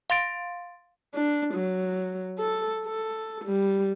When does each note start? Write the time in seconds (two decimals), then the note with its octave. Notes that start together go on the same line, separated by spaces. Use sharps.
0.10 F5 C6 A6 D7
1.15 D4
1.55 F#3
2.39 A4
2.86 A4
3.45 G3